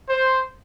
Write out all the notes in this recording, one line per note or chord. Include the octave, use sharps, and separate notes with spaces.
C5